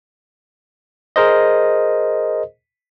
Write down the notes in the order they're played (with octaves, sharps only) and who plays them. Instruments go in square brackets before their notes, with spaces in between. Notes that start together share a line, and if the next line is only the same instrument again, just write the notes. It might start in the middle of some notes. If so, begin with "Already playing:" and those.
[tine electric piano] G#4 A#4 C5 D#5